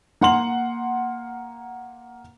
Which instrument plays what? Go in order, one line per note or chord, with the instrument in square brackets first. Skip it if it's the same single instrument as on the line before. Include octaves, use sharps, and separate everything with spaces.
[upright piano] A#3 F#5 C6 F#7